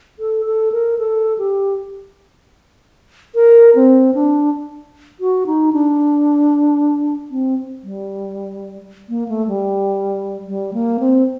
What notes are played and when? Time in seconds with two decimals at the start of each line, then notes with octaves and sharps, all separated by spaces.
0.19 A4
0.46 A4
0.72 A#4
0.99 A4
1.38 G4
3.35 A#4
3.75 C4
4.14 D4
5.20 F#4
5.47 D#4
5.73 D4
7.31 C4
7.83 G3
9.09 A#3
9.29 A3
9.48 G3
10.47 G3
10.74 A#3
11.00 C4